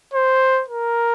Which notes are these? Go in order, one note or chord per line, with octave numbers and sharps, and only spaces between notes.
C5
A#4